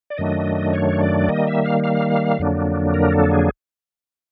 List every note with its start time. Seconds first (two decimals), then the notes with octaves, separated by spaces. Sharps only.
0.10 D5
0.18 F#2 D#3 F#3 A3 D4 D#5
0.73 C#5
1.01 D5
1.28 D#3 G3 A#3 D#5
1.47 E5
1.65 F5
1.84 F5
2.39 F2 D3 F#3 A#3 D4
2.94 A#4
3.12 A4
3.31 G#4